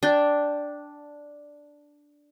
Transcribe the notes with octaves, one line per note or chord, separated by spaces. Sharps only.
D4 G5